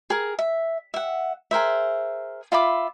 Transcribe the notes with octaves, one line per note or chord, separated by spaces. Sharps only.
G#4 A#4
E5
E5 F#5
G#4 A#4 C5 E5
F4 E5 B5 D6